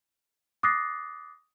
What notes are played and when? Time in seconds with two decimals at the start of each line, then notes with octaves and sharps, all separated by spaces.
0.63 D6 D#6 F#6 A6 A#6 C7